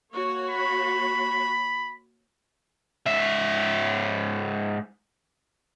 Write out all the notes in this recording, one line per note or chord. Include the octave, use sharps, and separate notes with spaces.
A#3 F#4 C#5
B5
G#2 E5